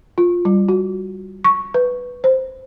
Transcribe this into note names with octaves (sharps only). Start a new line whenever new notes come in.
F4
G3
F#4
C#6
B4
C5